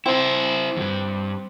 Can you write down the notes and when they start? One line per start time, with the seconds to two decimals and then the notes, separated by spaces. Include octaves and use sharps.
0.06 C4 E4 C5
0.76 E2 G2